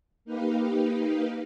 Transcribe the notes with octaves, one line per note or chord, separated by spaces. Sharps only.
A#3 D#4 G4 B4 F5